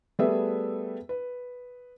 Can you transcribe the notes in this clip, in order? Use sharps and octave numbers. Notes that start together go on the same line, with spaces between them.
G3 A3 B3 G#4 B4 E5
B4